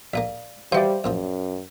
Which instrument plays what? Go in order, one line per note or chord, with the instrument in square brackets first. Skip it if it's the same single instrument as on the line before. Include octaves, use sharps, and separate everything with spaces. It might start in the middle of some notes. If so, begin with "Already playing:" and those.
[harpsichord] A#1 A#3 [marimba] D5 F5
[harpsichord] E3 F#4 [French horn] G3 [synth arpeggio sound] C5 D5 [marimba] E5 F5
[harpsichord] A#1 A#2 F3 [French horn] F#2